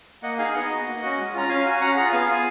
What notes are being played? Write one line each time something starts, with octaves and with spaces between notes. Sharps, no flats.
A#3 D#5 F#5
D#4 G#4 F5 G#5
B3 D#5 F#5
D#4 F#4
A#3
C#4 F#4
G#3
C#4 F4 A#5
C#4 F5 G#5
F#4
C#4 F#5 A#5
F4 G#4 F#5 A#5
B3 F5 G#5
F4 G#4